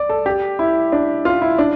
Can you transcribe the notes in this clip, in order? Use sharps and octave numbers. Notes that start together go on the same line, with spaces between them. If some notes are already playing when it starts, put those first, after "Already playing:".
Already playing: D5
A4
G4
E4
D4
F4
E4
D4